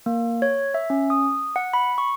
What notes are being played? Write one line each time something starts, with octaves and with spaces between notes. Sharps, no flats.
A#3
C#5
E5
C#4
D#6
F#5
B5
C#6